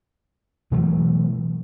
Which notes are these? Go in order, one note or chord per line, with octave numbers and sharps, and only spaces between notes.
B2 E3 F#3 A3